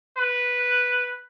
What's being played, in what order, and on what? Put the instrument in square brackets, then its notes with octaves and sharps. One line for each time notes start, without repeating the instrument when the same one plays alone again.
[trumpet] B4